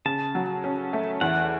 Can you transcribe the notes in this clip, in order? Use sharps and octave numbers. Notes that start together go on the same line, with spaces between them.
C#3 A5
F#3
C#4
A3
E2 F#5